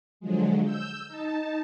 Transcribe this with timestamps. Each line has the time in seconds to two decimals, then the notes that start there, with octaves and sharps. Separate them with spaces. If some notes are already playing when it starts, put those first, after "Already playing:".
0.20 D3 F3 F#3 G#3
0.64 E6 G6
1.08 D#4 A5